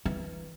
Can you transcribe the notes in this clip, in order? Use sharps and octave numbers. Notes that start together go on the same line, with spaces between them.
E3